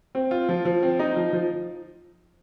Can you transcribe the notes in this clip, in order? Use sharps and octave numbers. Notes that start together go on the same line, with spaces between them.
C4
F4
F3
F3
C4
D#4
F3
F3